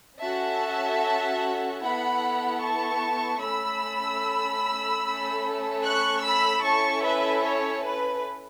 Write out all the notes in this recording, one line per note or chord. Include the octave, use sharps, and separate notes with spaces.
C#4 F#4 A4 E5 A5
B3 E4 A4 F#5 B5
A5 C#6
A3 C#4 A4 B5 E6
A3 C#4 A4
C#6 F#6
B5 E6
C#4 E4 A4 A5 C#6
B4 E5
C#5
B4